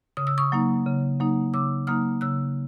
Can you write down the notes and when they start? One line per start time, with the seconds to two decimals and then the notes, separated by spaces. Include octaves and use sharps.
0.17 C#3 D#6
0.27 E6
0.38 C#6 D#6
0.52 F#3 A#3 D#4
0.86 C#3
1.20 F#3 A#3 D#4
1.53 C#3 D6 E6
1.87 F#3 A#3 D#4 D#6 F6
2.21 C#3 E6 F#6